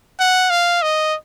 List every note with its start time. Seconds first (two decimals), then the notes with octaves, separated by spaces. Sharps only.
0.19 F#5
0.50 F5
0.82 D#5